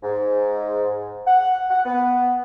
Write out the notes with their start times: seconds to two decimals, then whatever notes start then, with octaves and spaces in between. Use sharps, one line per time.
0.03 G#2
1.27 F#5
1.70 F#5
1.85 B3